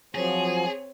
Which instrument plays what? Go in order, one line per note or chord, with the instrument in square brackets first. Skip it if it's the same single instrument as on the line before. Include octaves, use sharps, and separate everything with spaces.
[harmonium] F3 F#3 [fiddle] C4 C#5 [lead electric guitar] G#4